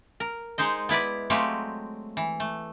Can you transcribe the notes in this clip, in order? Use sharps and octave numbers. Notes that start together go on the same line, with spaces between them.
A#4
G#3 D#4 C5 D#5
B3 E4 B4 D5
F#3 G#3 A3 C4 G4 F5
E3
A3